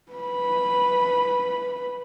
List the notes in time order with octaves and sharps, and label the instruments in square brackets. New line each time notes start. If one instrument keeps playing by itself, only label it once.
[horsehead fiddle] B4 B5